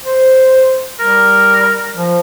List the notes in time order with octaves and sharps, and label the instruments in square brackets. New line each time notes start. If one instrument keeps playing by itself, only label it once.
[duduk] C5
[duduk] G3 [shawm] A#4
[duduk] F3